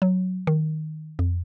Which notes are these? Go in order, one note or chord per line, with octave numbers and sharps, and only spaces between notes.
F#3
D#3
F2